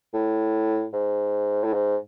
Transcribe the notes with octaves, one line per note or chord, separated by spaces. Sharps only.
A2
G#2
A2
G#2